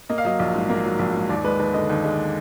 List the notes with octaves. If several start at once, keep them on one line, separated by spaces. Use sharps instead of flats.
A#3 D#5
F5
F#3 D#5
A#1
G#2
A#3
F#3
A#1
G#2
D#2 D5
G#3 B4
D#2 B4
D3 D#5
D#2
G#3